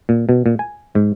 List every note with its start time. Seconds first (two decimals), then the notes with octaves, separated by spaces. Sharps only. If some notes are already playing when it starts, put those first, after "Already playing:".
0.09 A#2
0.29 B2
0.46 A#2
0.59 G#5
0.95 G#2